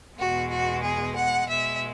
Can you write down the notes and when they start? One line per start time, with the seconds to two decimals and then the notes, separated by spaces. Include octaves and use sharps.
0.17 E2 B2 G#3 F#4
0.50 F#4
0.82 G#4
1.15 F#5
1.47 B2 G#3 E5